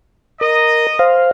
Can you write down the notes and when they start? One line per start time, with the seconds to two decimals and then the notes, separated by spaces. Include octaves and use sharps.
0.41 A#4 D#5
0.99 C5 F5